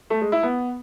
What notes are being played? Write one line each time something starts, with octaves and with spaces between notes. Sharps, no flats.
A3
G#3
E4
B3